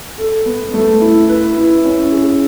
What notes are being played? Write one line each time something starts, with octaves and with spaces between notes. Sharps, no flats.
A4
B3
A3
E4
B4
E4
C#4
G#4